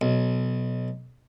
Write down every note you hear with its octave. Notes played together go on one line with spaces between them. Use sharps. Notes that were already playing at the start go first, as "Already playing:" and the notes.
B1